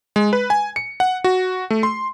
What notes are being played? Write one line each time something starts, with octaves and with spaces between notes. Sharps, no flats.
G#3
B4
G#5
C#7
F#5
F#4
A3
C6